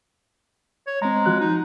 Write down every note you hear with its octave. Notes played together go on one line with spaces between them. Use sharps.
C#5
G#3 C4 A#5
F3 F#4 F#6
D#4